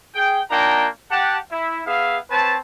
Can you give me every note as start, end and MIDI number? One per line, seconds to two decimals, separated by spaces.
0.14 0.40 68
0.14 0.40 79
0.50 0.87 58
0.50 0.87 62
0.50 0.87 63
0.50 0.87 65
0.50 0.87 79
0.50 0.87 82
1.11 1.37 67
1.11 1.37 78
1.11 1.37 81
1.51 1.81 64
1.86 2.17 59
1.86 2.17 68
1.86 2.17 76
1.86 2.17 77
2.30 2.56 60
2.30 2.56 71
2.30 2.56 73
2.30 2.56 81